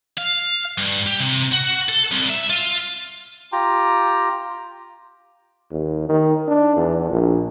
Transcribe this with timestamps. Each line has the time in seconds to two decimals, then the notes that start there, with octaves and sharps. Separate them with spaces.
0.17 F5
0.78 G2
1.07 G4
1.20 C3
1.52 F#4
1.89 A4
2.12 C2
2.30 E5
2.50 F4
3.52 F4 G4 G5 A#5
5.71 D#2
6.09 D#3
6.48 D4
6.77 E2
7.10 A#1